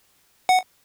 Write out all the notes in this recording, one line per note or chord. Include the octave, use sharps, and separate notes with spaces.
F#5